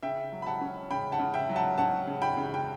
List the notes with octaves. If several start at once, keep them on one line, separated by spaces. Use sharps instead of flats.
C#3 E5 G5
F#3
B5
F#5 A5
C#4
C#3 G5 B5
F#5 A5
C#3
E5 G5
F#3
F#5 A5
C#4 F#5 A5
C#3
G5 B5
C#3
G5